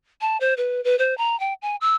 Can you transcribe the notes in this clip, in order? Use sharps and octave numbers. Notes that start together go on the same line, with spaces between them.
A5
C5
B4
B4
C5
A#5
G5
G#5
E6